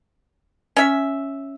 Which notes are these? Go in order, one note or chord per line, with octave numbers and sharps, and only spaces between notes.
C#4 E5